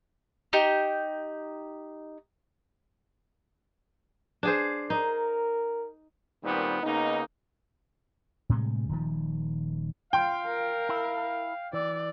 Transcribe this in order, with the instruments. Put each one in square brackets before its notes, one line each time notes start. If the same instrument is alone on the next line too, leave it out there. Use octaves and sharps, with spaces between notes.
[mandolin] D#4 G4
[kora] D4 G#4 C5
[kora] D#4 [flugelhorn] A#4
[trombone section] A#2 D#3 G3 B3 C4 D#4
C#3 A#3 B3 D#4
[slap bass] A2 C3 G3 G#3
D#1 D#3 F3
[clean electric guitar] F4 [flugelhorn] F5 [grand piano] G5
[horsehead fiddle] A#4
[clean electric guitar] E4
[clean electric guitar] E3 [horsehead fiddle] D5